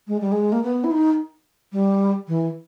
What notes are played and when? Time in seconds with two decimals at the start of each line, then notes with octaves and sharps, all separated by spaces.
0.08 G#3
0.21 G3
0.32 G#3
0.52 A#3
0.63 B3
0.84 E4
0.91 D#4
1.73 G3
2.28 E3